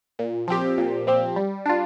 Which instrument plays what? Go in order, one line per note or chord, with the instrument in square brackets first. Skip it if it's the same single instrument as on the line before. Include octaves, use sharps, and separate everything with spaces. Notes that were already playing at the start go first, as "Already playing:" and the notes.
[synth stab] A#2
F3 C4 G4
A#2
F3 C4 G4
G3
D4 F4